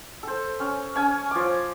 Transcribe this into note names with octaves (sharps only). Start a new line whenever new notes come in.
A4 C5
C#4
C#4 G#5 A5
F3 D6